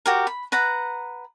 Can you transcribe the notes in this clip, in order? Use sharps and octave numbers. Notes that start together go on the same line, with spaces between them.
F#4 G4 A#4
B5
B4 F#5 A#5